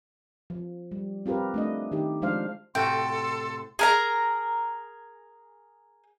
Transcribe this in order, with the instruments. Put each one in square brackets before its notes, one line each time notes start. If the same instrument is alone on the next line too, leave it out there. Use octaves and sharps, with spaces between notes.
[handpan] F3
G3
C4 F4 G4 A#4 B4
A3 D4 D#5
D#3 D#4 G4
F3 G#3 D4 C5 F5
[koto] A2 C3 F#4 [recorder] A4 [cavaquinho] G5 [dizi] C6
[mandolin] G#4 A#4 A#5